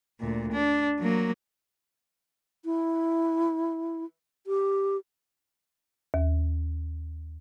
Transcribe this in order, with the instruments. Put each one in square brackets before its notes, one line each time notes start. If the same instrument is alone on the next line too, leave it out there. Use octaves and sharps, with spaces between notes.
[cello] D2 A#2
D4
F#3 A#3
[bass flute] E4
G4
[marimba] D#2